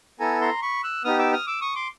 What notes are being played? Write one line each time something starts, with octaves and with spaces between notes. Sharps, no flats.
B3 E4 A4 G#5 A#5
A#5 C6
B5 C#6
E6 F#6
B3 D#4 G4 D#6 F6
D6 E6
D#6 F6
D6 E6
C#6 D#6
C6 D6